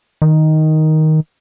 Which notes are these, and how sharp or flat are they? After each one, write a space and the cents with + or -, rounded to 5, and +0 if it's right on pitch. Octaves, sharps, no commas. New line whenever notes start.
D#3 +5